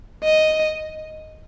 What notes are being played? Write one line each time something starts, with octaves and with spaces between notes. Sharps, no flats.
D#5